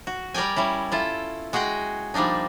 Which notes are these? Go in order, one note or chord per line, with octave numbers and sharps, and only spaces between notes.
F#4
G3 A#4 D5 G5 G#5
G3 C#4 E4
E4 F4 A4
G#3 F#4 G#4 F#5 G5
F3 G3 A#3 D4 D#4